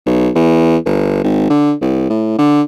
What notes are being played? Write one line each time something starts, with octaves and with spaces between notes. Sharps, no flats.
B1
E2
G1
G#1
D3
C2
A2
D3